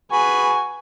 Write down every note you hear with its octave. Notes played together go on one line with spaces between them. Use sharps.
F#4 G#4 B4 G#5